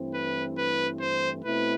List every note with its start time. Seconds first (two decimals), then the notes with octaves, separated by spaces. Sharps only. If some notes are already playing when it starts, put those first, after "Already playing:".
Already playing: G2 E3 A3 C4 E4
0.14 B4
0.58 B4
1.01 C5
1.45 B2 A3 C4 E4 B4